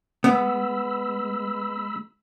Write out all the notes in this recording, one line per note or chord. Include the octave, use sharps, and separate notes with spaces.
G#3 B3 B5 E6